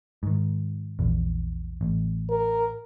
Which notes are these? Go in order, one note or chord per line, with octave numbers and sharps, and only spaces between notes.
G#2 D#3
A#1 E2
A1
A#4